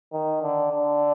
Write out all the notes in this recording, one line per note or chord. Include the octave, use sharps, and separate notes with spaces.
D#3
D3
D3